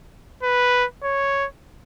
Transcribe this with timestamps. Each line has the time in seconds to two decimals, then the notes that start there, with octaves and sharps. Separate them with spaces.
0.43 B4
1.04 C#5